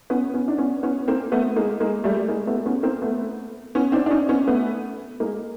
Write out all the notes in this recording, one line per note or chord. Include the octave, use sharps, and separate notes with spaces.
B3 C#4
B3 C#4
D4
B3 C#4
B3 C#4
A#3 C4
A3 B3
G#3 A#3
G#3 A#3
G3 A3
G#3 A#3
A3 B3
B3 C#4
A#3 C4
A3 B3
B3 C#4
C4 D4
D4
C#4 D#4
B3 C#4
A3 B3
G#3 A#3